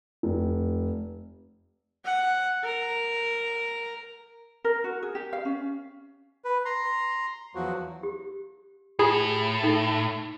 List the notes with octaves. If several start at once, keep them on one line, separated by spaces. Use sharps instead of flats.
F1
F#5
A#4
A#4
F#4
G#4
G4
F5
C#4
B4
A#5 C6
E2 F3 F#3 F#4
G4
A2 F4 G4 G#4
D#4 A4 G5